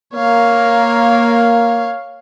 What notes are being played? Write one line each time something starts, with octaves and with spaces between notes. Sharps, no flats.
A#3 C#5 F5